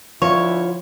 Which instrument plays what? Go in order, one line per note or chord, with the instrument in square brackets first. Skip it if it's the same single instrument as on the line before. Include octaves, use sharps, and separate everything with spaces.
[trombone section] D2 E4 [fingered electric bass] F3 [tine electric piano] F4 [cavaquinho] C#5